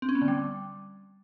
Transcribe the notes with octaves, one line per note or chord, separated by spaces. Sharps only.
C4
C#4
B3
D3
G3